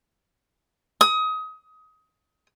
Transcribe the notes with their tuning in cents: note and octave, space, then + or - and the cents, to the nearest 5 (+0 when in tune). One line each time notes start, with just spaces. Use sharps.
D#6 +25